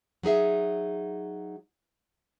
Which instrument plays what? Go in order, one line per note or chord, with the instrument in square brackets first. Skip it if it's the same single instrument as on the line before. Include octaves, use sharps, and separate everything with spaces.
[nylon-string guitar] F#3 D#4 G#4 E5